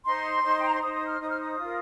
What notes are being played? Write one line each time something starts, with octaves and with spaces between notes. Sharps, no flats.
D#4 C5 C6
D#4 C5
G5
A#5
C6
D#4 C5 D#6
D#6
F6
D#4 C5 D#6
F6
D#6
F4 A#4